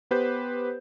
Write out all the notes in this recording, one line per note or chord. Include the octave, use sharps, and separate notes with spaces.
B3 G4 B4 C5 G6